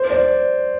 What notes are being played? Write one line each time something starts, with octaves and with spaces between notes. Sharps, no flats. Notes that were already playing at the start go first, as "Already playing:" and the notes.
Already playing: C5
D5